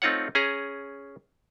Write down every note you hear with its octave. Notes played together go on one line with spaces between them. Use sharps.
A3 C4 D#4 F4 C#5 F#5
C#4 G#4 A#5